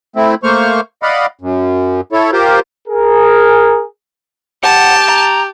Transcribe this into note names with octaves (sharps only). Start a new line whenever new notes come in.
A3 C4 E4
A3 A#3 C5 C#6 F6
D5 D#5 F5 F#5 B5
F#2
E4 A4 C#5
F4 G4 A#4 C5
G#4 A#4
G4 F#5 A5
A#5